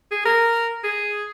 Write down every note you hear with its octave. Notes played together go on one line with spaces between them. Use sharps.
G#4
A#4
G#4